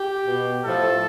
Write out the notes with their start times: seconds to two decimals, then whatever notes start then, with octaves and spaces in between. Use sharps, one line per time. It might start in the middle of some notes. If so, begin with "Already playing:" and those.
Already playing: G4
0.26 B2
0.62 A2 F3 A4